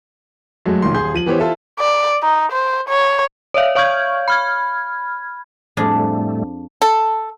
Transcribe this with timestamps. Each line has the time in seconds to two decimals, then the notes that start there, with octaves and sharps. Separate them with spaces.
0.65 F#2 F#3 G#3 A3
0.82 B1 A#2 D#3 C6
0.94 D#1 G#4 C6 G6
1.14 F3 D#7 F#7
1.26 E3 B3 G4 C5 C#5
1.39 E4 F4 A4 C5 E5
1.79 D5
2.22 D#4
2.52 C5
2.88 C#5
3.54 C#5 D5 E5 F5
3.75 C#5 F5 C#6 F6 G6 G#6
4.28 B5 F6 G#6
5.77 F2 A2 G3 A3 D4 G#4
6.82 A4